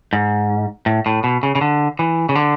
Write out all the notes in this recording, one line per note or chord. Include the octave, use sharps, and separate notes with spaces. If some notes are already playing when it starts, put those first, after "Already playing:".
G#2
A2
A2
B2
C#3
C#3
D3
E3
C#3
D3